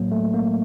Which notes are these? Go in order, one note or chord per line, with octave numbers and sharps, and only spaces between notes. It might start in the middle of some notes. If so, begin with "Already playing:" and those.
Already playing: A2 F#3 A#3
A3
A#3